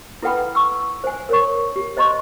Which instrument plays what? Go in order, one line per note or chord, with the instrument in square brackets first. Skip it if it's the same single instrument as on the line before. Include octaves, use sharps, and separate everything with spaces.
[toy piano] E4 A4 B4 F#5 G5 B5
C#6 E6
C5 G#5
A#4 C#5 C#6
G4
C5 D#5 A#5 C6 C#6